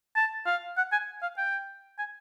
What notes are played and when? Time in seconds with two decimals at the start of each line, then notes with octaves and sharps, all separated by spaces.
0.16 A5
0.46 F5
0.77 F#5
0.92 G#5
1.22 F5
1.38 G5
1.98 G#5